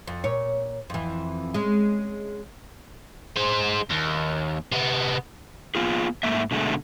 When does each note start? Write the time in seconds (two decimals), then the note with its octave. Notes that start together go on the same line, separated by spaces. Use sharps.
0.07 F2
0.24 A#2 C#5
0.90 F2 E3
1.54 G#3 C#4
3.36 G#3 C5
3.90 D#2
4.72 C3 B3
5.75 A#3 B3 F4 G#4
6.23 G#2 A3 A#3 E5
6.51 B2 D3 G#3 A3